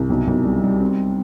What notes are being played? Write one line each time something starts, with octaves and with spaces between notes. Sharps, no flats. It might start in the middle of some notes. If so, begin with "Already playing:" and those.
Already playing: C2
B1
B1
G3
G3
C4